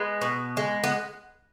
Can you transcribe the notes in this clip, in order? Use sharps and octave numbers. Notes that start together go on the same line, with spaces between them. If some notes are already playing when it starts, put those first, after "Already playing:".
Already playing: G#3 B3
B2
G#3
B3